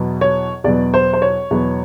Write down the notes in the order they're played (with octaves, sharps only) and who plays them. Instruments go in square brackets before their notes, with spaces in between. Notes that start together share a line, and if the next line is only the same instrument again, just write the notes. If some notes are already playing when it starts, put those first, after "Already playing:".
Already playing: [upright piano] E2 B2 F#3 B3
C#5
E2 B2 F#3 B3 D5
C5
C5
C#5
E2 B2 F#3 B3